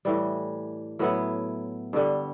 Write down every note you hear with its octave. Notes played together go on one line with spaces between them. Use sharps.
A2 E3 G3
A2 F#3 B3 E4
G2 D3 G3